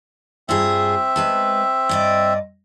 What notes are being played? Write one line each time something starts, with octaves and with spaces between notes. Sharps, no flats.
G2 C4 F4 G#4 E5
G#3 B4 A5
G2 D5 D#5